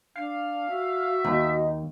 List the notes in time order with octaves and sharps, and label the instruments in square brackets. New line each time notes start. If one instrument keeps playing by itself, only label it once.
[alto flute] D4 [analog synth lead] F5
[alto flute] F#4 [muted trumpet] E5
[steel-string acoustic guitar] D#2 [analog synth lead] D#4